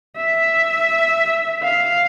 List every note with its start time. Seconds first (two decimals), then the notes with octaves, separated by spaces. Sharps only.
0.17 E5
1.63 F5